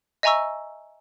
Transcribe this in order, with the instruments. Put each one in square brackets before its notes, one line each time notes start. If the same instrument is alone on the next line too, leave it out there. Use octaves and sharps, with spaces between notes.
[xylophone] D#5 E5 G#5 A#5 C#6 E6